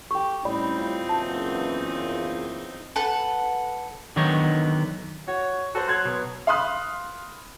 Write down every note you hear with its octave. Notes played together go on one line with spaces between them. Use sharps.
G4 A4 G5 C#6
A2 G3 C4 C#4 D#4 D5 B5
F4
F#1 E2 A5
A4 B4 F#5
D3 D#3 F#3 B3 D#4 C#5
F#4 C#5
F#4 A4 C5
F#3 C6 F#6 G#6
B2
F5 B5 C6 D#6 F#6